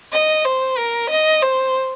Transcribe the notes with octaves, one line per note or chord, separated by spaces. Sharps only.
D#5
C5
A#4
D#5
C5